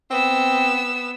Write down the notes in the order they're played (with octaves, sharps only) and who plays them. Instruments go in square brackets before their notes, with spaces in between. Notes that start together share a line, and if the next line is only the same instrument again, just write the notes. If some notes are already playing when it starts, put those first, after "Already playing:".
[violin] B3 E6 [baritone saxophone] C4